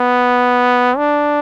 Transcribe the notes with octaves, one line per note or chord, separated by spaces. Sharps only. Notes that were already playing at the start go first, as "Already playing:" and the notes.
Already playing: B3
D4